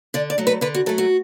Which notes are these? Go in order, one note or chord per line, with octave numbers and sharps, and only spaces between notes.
D3 D5
D5
F#3 A3
B4
D3 B4
F#4
F#3 A3 A4
F#4